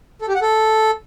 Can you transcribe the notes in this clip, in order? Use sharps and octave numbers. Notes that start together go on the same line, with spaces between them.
A4
G4
F#5
A4